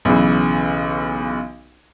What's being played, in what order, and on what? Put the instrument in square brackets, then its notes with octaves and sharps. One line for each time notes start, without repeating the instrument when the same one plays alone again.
[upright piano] B1 C#3 E3